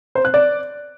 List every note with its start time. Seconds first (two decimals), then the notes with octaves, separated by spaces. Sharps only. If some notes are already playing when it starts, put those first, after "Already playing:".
0.15 C5
0.25 F#6
0.34 D5